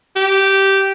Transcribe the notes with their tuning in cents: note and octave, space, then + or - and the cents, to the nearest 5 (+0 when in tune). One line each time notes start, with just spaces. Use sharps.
G4 -10